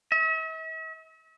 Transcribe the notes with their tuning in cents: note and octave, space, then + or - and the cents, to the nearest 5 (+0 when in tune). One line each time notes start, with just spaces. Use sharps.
E5 -45